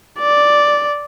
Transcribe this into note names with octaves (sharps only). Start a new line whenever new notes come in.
D5